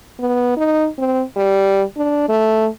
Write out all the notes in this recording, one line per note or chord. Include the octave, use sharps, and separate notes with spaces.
B3
D#4
C4
G3
D4
A3